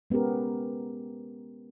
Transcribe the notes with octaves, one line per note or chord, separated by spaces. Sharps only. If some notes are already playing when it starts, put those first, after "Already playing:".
G#3 B3 C#4 G4 A#4